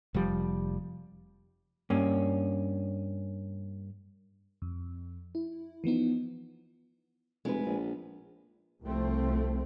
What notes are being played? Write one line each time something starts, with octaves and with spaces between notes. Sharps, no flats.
F1 F3 G3
G2 A#3 C#4
F2
E4
E3 F3 B3 D#4
F1 G#3 B4
A#1
C2 F3 A3 C4